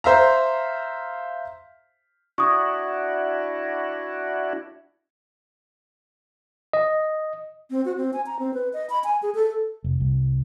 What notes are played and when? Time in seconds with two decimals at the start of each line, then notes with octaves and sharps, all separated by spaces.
0.04 C5 E5 F5 A#5
2.38 D4 E4 F#4 C#6 D#6
6.73 D#5
7.71 C4
7.85 F#4
7.97 C4
8.13 G#5
8.26 A#5
8.39 C4
8.54 B4
8.73 D#5
8.90 B5
9.04 G#5
9.23 G#4
9.35 A4
9.84 F1
10.00 C2